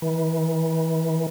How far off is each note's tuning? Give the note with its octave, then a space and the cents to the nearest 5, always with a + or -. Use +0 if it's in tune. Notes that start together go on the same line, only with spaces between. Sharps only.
E3 -30